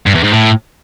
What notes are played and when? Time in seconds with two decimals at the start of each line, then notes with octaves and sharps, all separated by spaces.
0.06 G2
0.15 E2
0.24 G#2
0.33 A2